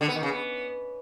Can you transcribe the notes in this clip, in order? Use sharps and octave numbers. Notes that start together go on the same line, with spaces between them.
D3
B3
D#3
C#3
B3